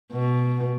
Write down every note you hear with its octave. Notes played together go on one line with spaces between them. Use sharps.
B2